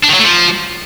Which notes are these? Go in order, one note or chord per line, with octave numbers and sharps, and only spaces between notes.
D4
D#3
F#3
A3
F3